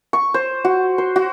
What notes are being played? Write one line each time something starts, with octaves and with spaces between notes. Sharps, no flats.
C#6
C5
F#4
C5
F#4